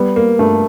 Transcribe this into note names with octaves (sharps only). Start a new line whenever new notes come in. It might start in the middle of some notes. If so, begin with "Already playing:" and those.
Already playing: G3 B3
A#3
G2 A3